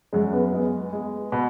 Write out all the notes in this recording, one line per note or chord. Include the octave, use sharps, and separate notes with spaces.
F#2 G#3
B3
G#3 B3
G#3
B2